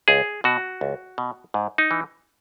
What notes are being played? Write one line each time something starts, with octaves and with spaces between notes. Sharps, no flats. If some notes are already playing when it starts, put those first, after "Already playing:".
C#2 G#4
B2 F#4
C#2
B2
G#2
D#4
E3